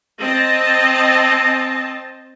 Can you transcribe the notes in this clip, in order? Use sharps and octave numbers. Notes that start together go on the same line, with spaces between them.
C4 D#5 A5